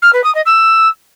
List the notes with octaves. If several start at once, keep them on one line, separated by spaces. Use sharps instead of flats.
F6
B4
D#6
D#5
E6